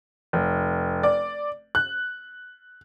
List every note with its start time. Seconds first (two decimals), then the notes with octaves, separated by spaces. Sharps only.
0.33 F1
1.03 D5
1.75 F#6